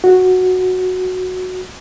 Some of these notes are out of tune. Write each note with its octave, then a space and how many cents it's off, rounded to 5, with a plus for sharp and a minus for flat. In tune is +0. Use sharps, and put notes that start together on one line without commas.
F#4 -5